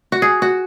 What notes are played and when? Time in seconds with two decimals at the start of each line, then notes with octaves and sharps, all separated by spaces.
0.12 F#4
0.22 G#4
0.42 F#4